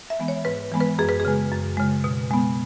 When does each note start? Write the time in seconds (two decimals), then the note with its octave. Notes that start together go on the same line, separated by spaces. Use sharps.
0.10 E5
0.19 E3 G#3 B3
0.28 C#5
0.45 G#2 B4
0.72 E3 G#3 B3
0.80 B4
0.99 F#2 G#4
1.09 B4
1.20 G#4
1.25 C#3 G#3
1.51 F#2
1.77 C#3 G#3
2.04 B2
2.31 G#3 B3